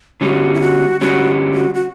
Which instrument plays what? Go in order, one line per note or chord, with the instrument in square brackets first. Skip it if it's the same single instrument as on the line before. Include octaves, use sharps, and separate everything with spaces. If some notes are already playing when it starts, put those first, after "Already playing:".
[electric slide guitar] D3 G3 C#4 [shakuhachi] F#4
[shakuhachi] E4
F#4
[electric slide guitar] D3 G3 C#4 [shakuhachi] F#4
[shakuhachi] F#4
F#4